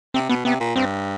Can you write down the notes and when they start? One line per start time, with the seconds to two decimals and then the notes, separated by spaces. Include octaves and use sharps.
0.14 C3 C4
0.29 B2 B3
0.45 C3 B3
0.60 A#2
0.75 G2 C4